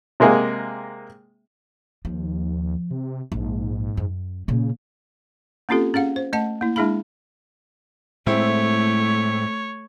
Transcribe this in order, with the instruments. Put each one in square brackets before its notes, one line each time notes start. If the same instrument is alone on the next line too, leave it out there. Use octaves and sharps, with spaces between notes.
[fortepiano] C3 G#3 A#3 G#4
[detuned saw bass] D#2 [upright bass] F3
[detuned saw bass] C3
[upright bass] A#1 [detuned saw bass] G#2
[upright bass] F#2
[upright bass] A#2 A#3 [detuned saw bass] C#3
[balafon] A#3 C4 C#4 F4 G4 A4
C#4 G#4 F5 F#5
C5
A3 D#5 F#5 A5
A#3 E4
G#3 D4 E4 G#4 F5 B5
[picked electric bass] A2 G#3 [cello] A3 [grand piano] C4 E4 [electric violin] C#5